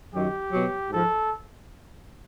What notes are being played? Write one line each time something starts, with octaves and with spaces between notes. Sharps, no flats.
F#2 D#3 F#3 G4
B2 F#3
G#2 F3 A4